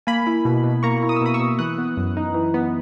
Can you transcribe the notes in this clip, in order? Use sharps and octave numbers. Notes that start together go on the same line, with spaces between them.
A#3 G#5 B5
E4
B2
B2
A#3 A#5 C#6
E4
D#6
E6
B2 B5 D#6
C#6 E6
B2
E3 D#6 F#6
B3
F#2
D#4
E3
B3